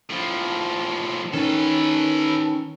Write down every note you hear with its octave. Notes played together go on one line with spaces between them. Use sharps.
A2 F3
D#3 C#4 A4 B4